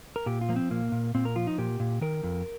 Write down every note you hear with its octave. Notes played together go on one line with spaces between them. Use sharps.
A#4
A#2 G4
F4
F3 A#3
C4
A#2 A#3
A#2
A#2 C4
A#4
F3 F4
D#4
A#2 G4
A#2
D#3 A#4
F2